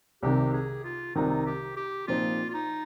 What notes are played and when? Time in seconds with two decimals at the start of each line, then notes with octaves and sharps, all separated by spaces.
0.23 C2 C3 D#3 G4
0.53 G#4
0.84 F4
1.15 C2 C3 D#3 D#4
1.46 G4
1.77 G4
2.07 A#2 F3 C4 D#4 F4
2.49 F4
2.54 D#4